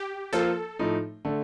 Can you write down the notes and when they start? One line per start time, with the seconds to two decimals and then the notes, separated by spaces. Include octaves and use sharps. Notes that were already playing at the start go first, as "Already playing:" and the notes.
Already playing: G4
0.33 F3 A#3 F4 A4 C5
0.79 A2 F3 A3 D#4
1.25 D3 A3